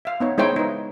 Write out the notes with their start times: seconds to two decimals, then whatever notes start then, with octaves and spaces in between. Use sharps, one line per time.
0.05 E5 F5
0.20 B3 D#4 C#5
0.38 G#3 D#4 E4 C5 C#5 G5
0.56 D#4 B4